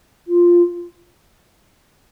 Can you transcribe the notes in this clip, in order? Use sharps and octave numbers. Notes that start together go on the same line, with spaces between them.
F4